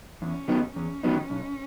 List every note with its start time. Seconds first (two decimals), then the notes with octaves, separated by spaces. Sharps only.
0.22 E2 C#4
0.48 D#3 F#3 B3 D#4
0.75 E2 C#4
1.03 D#3 F#3 B3 D#4
1.30 B1